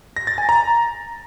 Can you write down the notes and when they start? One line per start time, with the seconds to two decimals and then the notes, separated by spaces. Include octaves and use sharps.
0.16 A#6
0.27 A6
0.38 G#5
0.49 A#5